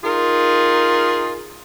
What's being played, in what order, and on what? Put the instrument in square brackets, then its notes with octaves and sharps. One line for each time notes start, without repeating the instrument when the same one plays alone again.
[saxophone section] D#4 F4 G#4 A#4